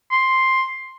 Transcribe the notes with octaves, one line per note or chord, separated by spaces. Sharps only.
C6